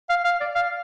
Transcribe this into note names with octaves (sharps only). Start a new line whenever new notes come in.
F5
F5
D5
F5